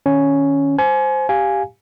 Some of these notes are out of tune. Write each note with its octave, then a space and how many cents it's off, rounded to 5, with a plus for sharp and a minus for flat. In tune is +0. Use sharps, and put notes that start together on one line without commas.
D#3 +5 C#4 +5
C5 +0 G#5 +30
G4 +0 F5 +0 G#5 +0